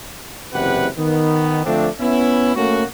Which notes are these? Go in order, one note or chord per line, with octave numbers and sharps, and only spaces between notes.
F#1 E2 C3 G4 B4 F#5
D#3 B3
D3 F3 A3 C4 D4
B3 C#4 E4
A3 A#3 C#4 F#4